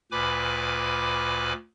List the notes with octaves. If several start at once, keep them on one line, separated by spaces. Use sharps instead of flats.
D2 A#2 B4 G#5 B5 D6